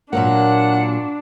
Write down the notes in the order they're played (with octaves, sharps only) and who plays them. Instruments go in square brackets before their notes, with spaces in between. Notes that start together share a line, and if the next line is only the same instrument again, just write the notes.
[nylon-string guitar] A#2 F#3 A#3 [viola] D4 [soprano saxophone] F#5